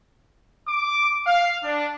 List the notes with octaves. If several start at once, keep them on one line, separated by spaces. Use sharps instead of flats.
D6
F5
D4